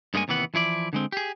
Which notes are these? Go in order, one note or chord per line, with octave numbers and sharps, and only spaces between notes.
G2 G#3 A#3 C#4 G#5
D#2 C3 E3 B3 F#5
E3 F3 E4 D5
D3 G#3 C4
G4 G#4